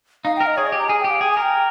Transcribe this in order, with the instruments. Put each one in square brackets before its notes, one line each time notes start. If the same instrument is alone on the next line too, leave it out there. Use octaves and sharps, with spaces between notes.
[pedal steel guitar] D#4 [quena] F5
[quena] G5
[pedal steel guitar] A#4
[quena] D#5
[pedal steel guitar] G#4 [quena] C#5
[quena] D#5
[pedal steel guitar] G4
[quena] A#5
[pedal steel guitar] G#4 [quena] G#5
[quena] G5
[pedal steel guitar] G4
[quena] F5
[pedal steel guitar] G#4 [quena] G5
[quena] G#5
[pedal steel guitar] A#4
[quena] G5